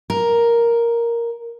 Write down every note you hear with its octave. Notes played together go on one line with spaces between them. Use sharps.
A#4